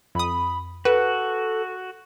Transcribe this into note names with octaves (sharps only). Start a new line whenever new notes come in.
F2 B5 D#6
F#4 A4 B4